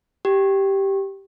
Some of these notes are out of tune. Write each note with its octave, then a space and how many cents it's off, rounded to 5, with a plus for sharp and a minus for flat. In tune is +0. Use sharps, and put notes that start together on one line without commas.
G4 -5